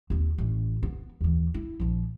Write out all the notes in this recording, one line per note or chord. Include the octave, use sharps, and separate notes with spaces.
D#2 C4
A1 C#4
B3
D#2 E3
E4
A#1 F3